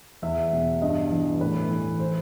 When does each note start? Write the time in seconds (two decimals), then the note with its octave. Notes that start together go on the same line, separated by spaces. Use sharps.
0.22 E2 E5
0.52 B2
0.82 G2 D#5
1.12 E3
1.41 A2 B4
1.70 E3
2.00 C5